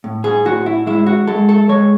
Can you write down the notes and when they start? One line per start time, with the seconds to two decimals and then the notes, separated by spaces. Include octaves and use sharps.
0.04 A2
0.24 G#4
0.45 A2 F#4
0.66 E4
0.87 G#3 E4
1.06 F#4
1.27 G#3 A4
1.49 A4
1.69 G#3 C#5